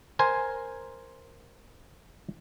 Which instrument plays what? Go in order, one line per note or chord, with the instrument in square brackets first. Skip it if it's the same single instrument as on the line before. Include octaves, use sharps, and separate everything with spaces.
[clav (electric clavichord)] A#4 C5 G#5